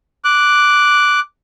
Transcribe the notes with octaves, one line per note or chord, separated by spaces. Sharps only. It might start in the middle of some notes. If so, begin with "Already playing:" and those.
D6 F#6